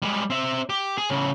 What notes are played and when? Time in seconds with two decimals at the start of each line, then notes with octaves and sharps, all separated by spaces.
0.02 G3 G#3
0.30 C4 E5
0.70 G4
0.98 G#4
1.10 A2 C#3